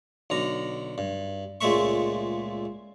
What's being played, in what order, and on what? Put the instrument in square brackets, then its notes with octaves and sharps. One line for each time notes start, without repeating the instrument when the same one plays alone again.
[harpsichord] B1 D3 A#5
G2
C#2 A#2 G#3 A3 E5 C#6